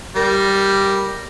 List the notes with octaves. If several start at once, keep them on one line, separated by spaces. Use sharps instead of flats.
G3 A#4